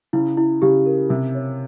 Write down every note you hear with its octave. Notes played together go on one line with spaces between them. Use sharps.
C#3 E4
E4
C#3 G4
A#4
C3 E5
C#5